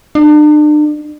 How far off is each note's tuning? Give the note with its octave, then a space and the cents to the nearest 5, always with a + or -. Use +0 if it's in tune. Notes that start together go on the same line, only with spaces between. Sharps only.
D4 +40